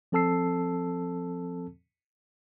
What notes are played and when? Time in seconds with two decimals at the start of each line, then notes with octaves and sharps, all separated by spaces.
0.12 F3 C4 A4 A5 E6 C7